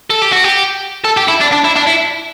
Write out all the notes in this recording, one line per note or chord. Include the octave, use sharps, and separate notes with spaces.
A4
G4
F#4
G4
A4
G4
E4
D4
D4
E4
D4
E4